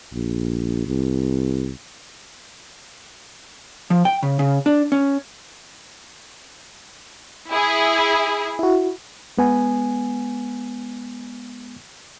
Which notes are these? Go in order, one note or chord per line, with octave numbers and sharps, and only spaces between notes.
A#1
C2
F3
G5
C#3
C#3
D4
C#4
E4 G#4
E4 F#4
G#3 B3 G#5